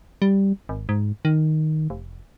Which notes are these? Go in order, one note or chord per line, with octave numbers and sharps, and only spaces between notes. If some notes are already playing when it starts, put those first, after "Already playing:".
G3
G#1
G#2
D#3
F1